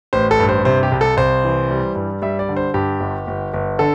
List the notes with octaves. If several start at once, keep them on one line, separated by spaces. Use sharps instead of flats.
A1 C5
A4
G2
C5
C3 C5
G4
C2
A4
C2 C5
E3
G3
G2
G3 E5
D5
D3
C5
G2 G4
G1
G1
G1
D3 A4